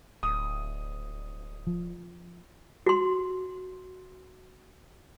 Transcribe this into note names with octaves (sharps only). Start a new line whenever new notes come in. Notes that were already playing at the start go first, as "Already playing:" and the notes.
D1 D#6
F3
F#4 C6